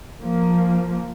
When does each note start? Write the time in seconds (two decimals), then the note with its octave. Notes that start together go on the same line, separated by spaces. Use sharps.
0.19 F3 A#3